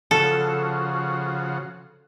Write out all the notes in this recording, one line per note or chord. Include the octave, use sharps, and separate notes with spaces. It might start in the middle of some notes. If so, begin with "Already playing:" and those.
C#3 F3 F#4 A4